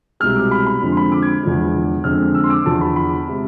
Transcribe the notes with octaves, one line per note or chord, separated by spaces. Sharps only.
C2 B2 G#3 F6
D6
B5
B5
F2 D3 F3 G#3
C6
B5
D6
G#6
E2 D3 F3 G#3
F2 D3 G#3 F6
E6
C6
D6
E2 D3 F3 A5
B5
B5
C3 G#3